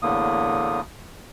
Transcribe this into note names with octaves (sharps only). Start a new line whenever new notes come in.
E2 A2 D3 A#3 D#6